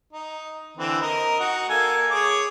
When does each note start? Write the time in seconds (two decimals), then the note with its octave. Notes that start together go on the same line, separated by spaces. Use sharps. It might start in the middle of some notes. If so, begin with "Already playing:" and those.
0.13 D#4
0.77 D3 E3 C4
1.01 A#4 D#5
1.40 D#4 F#4
1.69 A#3 A4 G#5
2.11 G#4 C#5 D6